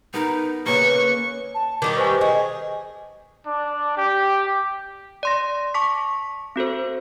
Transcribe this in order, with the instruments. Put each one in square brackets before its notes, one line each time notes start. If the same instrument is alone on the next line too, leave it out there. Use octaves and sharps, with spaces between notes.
[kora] B3 A#4 [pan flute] D#4
[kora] C#3 A#4 [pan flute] A#3 [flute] B4 [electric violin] C#6
[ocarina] A5
[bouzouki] D#3 G3 G4 [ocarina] D6
[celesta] B4 C5 G#5 [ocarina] C#6
[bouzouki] G#4 [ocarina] D#5
[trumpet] D4
G4
[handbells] D5 C6 A#6
A5 C#6 D6 B6
C4 F#4 A4 C5